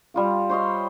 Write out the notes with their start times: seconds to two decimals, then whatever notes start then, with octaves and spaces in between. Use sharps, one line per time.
0.14 G3 F4 F5
0.50 C5 C#5 D#5 C6